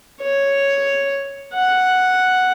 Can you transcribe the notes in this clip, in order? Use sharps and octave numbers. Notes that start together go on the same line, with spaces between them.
C#5
F#5